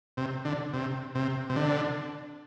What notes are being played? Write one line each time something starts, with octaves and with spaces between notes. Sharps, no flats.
C3
D3
C3
C3
C3
D3